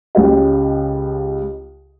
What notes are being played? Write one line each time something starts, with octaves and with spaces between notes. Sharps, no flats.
C#2 C#3 F4 G4 D#5